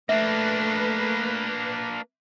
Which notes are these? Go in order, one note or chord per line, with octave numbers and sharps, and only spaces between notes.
A3 A#3 D4 B4 E5